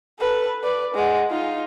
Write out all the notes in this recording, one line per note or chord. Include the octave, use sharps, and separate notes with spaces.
A4 B4
B4 D5
G#3 F#5
D#4 F4